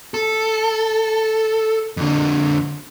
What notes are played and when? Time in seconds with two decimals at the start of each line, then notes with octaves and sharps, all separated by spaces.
0.14 A4
1.97 F2 D3